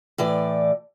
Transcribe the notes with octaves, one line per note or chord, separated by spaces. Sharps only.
A2 E3 D5